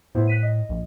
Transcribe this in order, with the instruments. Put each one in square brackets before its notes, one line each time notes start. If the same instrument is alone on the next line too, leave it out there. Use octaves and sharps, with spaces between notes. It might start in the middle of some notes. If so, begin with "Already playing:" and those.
[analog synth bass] A2 [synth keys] B3 E4 C5
[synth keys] F#6 B6 D#7
D#5
[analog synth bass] A#1